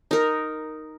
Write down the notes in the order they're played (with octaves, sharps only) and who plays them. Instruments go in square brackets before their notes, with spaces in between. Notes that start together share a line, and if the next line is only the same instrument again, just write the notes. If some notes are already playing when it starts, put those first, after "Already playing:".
[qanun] D#4 A#4